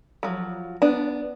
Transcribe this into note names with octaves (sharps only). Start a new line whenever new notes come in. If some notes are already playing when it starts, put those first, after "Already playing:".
F3 F#3
B3 D4